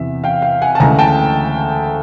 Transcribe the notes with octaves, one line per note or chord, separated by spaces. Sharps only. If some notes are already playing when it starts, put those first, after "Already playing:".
Already playing: E2 C3 E3 E5
F5 G5
F5 G5
F#5 G#5
A5
D2 C#3 E3 G#3 G#5 A#5
G5 A5